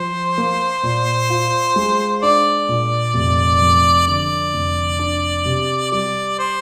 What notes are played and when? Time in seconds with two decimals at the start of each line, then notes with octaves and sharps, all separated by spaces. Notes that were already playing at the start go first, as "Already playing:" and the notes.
Already playing: F3 C5
0.38 A#3
0.83 A#2
1.30 F4
1.76 G#3
2.23 D4 D5
2.69 A#2
3.14 F1
3.62 F2
4.07 D3 D5
4.53 F1
4.99 D4
5.45 C3
5.92 G3 D5
6.39 C5